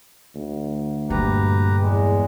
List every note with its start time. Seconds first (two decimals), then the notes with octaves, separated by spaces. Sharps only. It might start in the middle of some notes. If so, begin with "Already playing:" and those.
0.35 D2
1.10 G2 A#2 G4 B4 A#5
1.79 E2 G#3